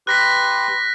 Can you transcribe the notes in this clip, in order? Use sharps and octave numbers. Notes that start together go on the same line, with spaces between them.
G4 B4 C6 F#6 A#6 B6